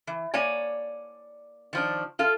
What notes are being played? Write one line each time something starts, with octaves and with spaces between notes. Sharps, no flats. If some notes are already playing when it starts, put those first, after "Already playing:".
E3
A#3 C#5 D5 G#5
D#3 F3 D4
F4 A4 F5